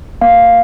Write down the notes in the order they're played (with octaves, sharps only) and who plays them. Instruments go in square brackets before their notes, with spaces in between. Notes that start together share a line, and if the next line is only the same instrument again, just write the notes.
[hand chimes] A#3 F5